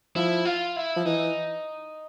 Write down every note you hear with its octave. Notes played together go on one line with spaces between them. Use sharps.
F3 E4
F4
E4
F3
E3 D#4